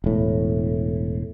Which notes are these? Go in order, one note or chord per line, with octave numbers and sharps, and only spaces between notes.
E1 A2